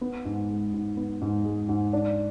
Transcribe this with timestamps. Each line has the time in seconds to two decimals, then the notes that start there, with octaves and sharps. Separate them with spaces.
0.01 B3
0.25 G#2
0.48 G#3
0.73 G#2
0.97 B3
1.21 G#2
1.44 G#3
1.69 G#2
1.93 D4